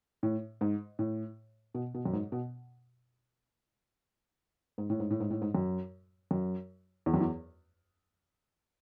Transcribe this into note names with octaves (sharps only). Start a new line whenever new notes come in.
A2
G#2
A2
B2
B2
F#2
G#2
B2
G#2
A2
G#2
A2
G#2
A2
G#2
F#2
F#2
E2
F#2
E2